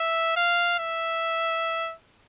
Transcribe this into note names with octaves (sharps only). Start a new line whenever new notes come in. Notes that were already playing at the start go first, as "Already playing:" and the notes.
Already playing: E5
F5
E5